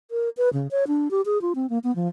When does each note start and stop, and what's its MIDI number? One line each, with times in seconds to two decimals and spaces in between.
0.11 0.29 70
0.37 0.49 71
0.53 0.68 49
0.71 0.84 73
0.87 1.11 62
1.11 1.21 67
1.26 1.41 68
1.42 1.53 65
1.55 1.69 60
1.70 1.79 58
1.84 1.94 59
1.96 2.08 53